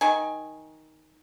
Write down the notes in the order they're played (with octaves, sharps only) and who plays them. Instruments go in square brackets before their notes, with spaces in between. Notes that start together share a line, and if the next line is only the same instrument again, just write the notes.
[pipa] D#3 G#5